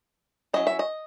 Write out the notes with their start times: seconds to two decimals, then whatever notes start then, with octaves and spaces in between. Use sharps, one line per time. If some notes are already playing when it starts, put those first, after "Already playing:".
0.53 F#3 C#4 E4 D#5
0.67 E5
0.79 D#5